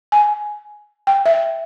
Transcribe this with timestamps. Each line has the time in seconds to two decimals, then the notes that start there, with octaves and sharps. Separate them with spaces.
0.12 G#5
1.07 G5
1.26 E5